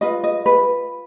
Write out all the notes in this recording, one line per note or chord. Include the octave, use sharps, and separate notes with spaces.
F4 B4 D#5
D#5
B4